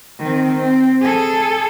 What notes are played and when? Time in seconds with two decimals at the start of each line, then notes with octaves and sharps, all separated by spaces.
0.19 D#3 C4
0.57 C4
1.01 G#4 A4